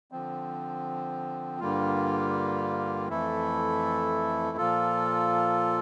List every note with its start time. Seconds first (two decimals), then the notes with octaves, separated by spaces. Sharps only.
0.12 D3 F3 C4
1.60 G2 D3 G3 A#3 F4
3.08 F2 E3 A3 E4 A4
4.57 A#2 F3 A#3 F4 A4